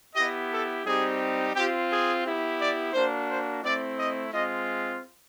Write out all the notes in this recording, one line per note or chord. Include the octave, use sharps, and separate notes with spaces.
B3 E4 G4 D#5
A4
G3 C4 D#4 G4 G#4
C4 F4 G4
G#4
B3 E4 G4
D5
A#3 D4 F#4 C5
C5
A3 C4 E4 D5
D#5
G#3 C4 F4 D#5